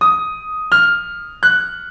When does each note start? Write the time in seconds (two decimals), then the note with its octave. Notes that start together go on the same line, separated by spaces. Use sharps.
0.01 D#6
0.72 F6
1.43 F#6